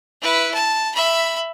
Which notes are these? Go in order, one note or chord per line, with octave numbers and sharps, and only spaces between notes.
E4 B4
A5
E5 B5